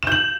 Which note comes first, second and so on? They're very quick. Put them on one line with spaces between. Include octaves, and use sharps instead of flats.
E7 G6 F#7